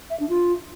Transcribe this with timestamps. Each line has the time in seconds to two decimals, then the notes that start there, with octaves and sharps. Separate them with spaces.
0.10 E5
0.20 D4
0.29 F4